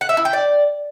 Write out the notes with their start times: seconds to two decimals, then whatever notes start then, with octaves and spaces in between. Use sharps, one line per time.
0.01 F#5
0.09 E5
0.17 E4
0.25 G5
0.33 D5